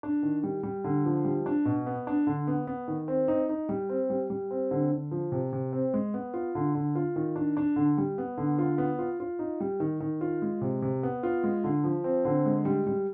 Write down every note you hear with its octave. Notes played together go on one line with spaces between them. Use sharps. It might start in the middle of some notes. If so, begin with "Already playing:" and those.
D4
D#3
G3
G3
D3
F3
G3
D4
B2
B3
D4
D3
B3
B3
D#3
C4
D#4
D#4
G3
C4
G3
G3
C4
D3
D3
F3
C3
C3
C4
G#3
B3
F4
D3
D3
F4
D#3
D4
D4
D3
G3
B3
D3
F4
B3
F4
F4
D#4
G3
D#3
D#3
F4
G#3
C3
C3
B3
F4
G#3
D3
F3
C4
D3
G#3
G3
G3